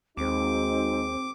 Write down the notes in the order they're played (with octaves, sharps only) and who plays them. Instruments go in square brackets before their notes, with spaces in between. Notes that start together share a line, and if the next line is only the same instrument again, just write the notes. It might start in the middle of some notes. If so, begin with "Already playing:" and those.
[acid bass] D#2 [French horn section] G#3 D#4 F#4 [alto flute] C4 [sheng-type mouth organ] D6